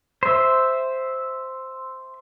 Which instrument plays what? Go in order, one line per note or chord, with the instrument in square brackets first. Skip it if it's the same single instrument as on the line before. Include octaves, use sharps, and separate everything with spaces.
[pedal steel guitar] C5 E5